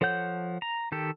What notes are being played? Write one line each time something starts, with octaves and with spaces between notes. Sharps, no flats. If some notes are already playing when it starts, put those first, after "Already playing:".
F3 A4 C#5 F#5 G6
A#5
D#3 G4 A4